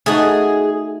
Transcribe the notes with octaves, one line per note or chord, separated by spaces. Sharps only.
A3 D#4 F#4 G#4